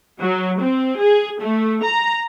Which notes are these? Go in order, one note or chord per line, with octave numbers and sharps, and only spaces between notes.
F#3
C4
G#4
A3
A#5